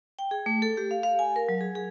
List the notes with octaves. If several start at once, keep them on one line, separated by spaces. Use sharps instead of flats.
G5
G#4
A3
A4
G4
F5
F5
G#5
A#4
F#3
G#4
G#4